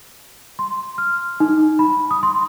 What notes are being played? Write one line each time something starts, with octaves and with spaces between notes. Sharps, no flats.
C6
F6
D#4
B5
D#6
C6